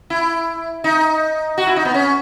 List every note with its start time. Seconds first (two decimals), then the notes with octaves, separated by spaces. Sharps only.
0.10 E4
0.84 D#4
1.58 F#4
1.67 E4
1.76 D#4
1.85 B3
1.94 C#4